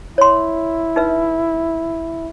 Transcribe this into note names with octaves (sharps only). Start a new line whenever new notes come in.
E4 C#5 C6
D#4 B4 E5